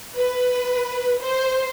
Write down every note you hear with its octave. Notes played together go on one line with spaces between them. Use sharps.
B4
C5